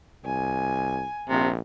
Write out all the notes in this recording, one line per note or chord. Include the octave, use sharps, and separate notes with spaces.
C2 G#5
A#1 C3